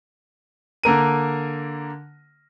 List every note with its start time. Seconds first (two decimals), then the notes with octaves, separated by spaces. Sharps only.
0.84 D3 A#3 A#4 D#7